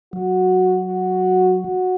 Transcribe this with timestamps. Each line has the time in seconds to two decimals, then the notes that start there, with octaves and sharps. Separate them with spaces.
0.13 F#3 F#4
0.85 F#4
1.57 F#4